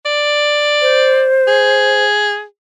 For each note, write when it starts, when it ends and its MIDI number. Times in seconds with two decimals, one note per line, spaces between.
0.05 1.34 74
0.82 2.04 72
1.47 2.44 68